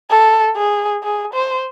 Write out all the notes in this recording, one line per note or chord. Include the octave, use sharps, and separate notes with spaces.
A4
G#4
G#4
C5